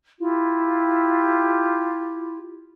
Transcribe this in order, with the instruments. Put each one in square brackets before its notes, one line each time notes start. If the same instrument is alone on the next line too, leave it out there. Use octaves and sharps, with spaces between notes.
[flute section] E4 F4 G4